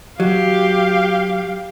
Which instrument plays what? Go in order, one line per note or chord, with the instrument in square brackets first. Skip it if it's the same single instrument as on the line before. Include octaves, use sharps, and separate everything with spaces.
[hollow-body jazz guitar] F#3 [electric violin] G4 F5